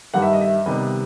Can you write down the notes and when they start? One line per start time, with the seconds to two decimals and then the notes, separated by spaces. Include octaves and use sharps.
0.14 G2 D#3 G3 F#5
0.22 E5
0.33 D#5
0.41 E5
0.66 C3 D#3 G3 B3 D#5